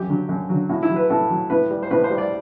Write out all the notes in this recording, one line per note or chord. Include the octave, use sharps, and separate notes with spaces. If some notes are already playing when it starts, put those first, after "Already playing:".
Already playing: F#2 G4
D3 F#3
F#2
D3 F#3
A2 F#4
E4
F#3
B4
A2 A4
F#3
A2 B4
G3
C5
A2 B4
C5
G3
D5